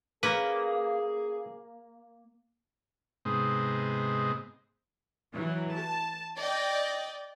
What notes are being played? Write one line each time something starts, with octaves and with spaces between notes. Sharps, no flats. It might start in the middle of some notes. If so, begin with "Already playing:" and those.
A#3 C#4 G#4 B4
G#2 C3 G#3 B3 C4 D#4
E3 F#3
A5
D5 D#5 G5